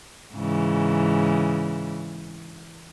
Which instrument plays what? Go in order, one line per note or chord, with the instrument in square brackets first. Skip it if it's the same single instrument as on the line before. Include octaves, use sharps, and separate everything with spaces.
[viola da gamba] G#2 C#3 E3